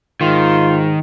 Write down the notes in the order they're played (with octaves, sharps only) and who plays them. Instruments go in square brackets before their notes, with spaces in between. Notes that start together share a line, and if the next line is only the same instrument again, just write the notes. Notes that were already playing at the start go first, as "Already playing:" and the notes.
[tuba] G#2 [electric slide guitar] D#3 [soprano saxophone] F4